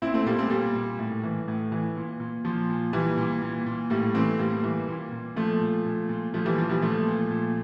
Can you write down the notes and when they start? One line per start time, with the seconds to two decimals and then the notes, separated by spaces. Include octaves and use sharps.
0.02 A#2 C4 E4
0.14 A3 C4
0.26 A#2 G3 A#3
0.39 A3 C4
0.50 A#2 G3 A#3
0.75 A#2
0.99 A2
1.23 E3
1.48 A2
1.72 E3
1.96 A#2
2.20 A#2
2.45 A#2 F3
2.70 A#2
2.93 A#2 E3 G3
3.18 A#2
3.42 A#2
3.66 A#2
3.90 A2 G3 A#3
4.15 E3 A3 C4
4.39 A2 G3 A#3
4.64 E3
4.88 A#2
5.12 A#2
5.36 A#2 F3 A3
5.61 A#2
5.85 A#2
6.09 A#2
6.33 A#2 F3 A3
6.45 E3 G3
6.58 A#2 F3
6.69 E3 G3
6.82 A#2 F3 A3
7.07 A#2
7.31 A#2